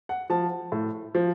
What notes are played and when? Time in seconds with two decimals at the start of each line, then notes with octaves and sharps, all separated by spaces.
0.09 F#5
0.30 F3 A5
0.72 A2
1.15 F3